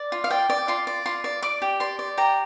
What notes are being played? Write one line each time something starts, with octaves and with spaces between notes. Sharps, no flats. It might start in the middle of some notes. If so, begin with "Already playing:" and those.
Already playing: D5
F4
F5
D5 G5
D5
F4 C6
D5
F4 C6
D5
D5 D6
G4
D5 C6
D5
G4 A#5